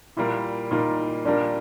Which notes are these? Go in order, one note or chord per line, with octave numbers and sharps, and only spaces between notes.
A#2 G3 A#3 E4
A#2 G3 A#3 D#4
A#2 G3 A#3 D4